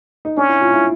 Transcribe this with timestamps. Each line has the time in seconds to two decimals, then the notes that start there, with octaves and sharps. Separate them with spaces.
0.25 D#4
0.37 C#4 D4
0.49 E4
0.61 F4
0.74 E4